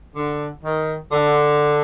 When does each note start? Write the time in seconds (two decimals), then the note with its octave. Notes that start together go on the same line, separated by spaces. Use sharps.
0.15 D3
0.63 D#3
1.12 D3